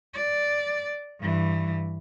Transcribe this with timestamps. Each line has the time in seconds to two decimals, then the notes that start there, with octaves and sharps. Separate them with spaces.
0.14 D5
1.20 G2 E3